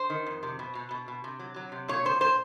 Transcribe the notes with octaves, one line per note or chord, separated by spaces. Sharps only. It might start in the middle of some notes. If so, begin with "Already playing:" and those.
Already playing: C5
D#3
F2
C3
B2
B2
B2
B2
C3
F#3
F#3
C3
A#2 C#5
A#2 C5
A#2 C5